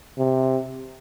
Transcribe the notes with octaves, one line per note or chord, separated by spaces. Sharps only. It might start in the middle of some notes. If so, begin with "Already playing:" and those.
C3